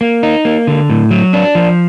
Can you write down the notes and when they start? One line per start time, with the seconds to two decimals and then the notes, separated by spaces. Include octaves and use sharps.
0.01 A#3
0.23 D#4
0.45 A#3
0.67 D3
0.90 A2
1.11 F#3
1.33 D4
1.55 F3